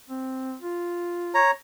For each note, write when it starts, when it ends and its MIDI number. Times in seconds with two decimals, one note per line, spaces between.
0.10 0.56 60
0.62 1.39 65
1.34 1.51 73
1.34 1.51 82